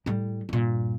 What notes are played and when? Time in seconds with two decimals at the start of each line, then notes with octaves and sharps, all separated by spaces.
0.06 A2 G3
0.49 G2 A#2